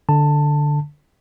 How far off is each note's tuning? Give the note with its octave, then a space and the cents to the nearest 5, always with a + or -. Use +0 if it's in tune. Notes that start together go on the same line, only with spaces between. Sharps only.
D3 +0 A5 +15